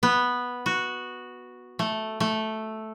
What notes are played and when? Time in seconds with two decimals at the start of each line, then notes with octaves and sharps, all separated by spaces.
0.03 B3
0.66 F#4
1.79 A3
2.20 A3